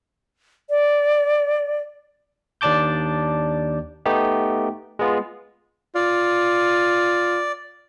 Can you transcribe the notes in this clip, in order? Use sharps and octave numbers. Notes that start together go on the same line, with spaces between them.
D5
D#2 D4 D5 A5 D6 G6
A3 B3 D#4 G4
G#3 B3 F4
F4 D5